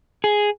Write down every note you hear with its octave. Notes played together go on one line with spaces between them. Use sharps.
G#4